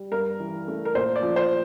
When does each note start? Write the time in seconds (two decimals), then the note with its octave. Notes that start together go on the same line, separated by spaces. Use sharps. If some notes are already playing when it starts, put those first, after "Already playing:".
Already playing: G3
0.12 G2 A#4
0.40 E3
0.68 A3
0.85 A#4
0.95 A#2 C5
1.16 D5
1.23 F3
1.36 C5